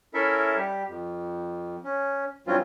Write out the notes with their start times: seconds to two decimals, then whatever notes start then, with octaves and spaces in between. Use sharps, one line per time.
0.14 C#4 E4 A4 A#4 E5
0.56 G3 G4
0.88 F2
1.84 C#4
2.47 G2 E3 F#3 C4 C#4 F4